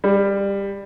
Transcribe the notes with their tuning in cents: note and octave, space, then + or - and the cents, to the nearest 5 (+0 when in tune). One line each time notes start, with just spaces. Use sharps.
G3 +20